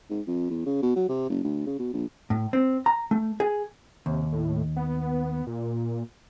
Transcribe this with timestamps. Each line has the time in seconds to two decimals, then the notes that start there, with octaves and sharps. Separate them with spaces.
0.10 G#2
0.27 F2
0.50 E2
0.66 C#3
0.82 B2
0.96 F#3
1.09 C3
1.30 F#1
1.44 D2
1.67 C#3
1.79 B2
1.94 A#1
2.30 A2
2.53 C4
2.86 A#5
3.11 A3
3.40 G#4
4.06 D#2 C3
4.32 A2
4.76 B3
5.47 A#2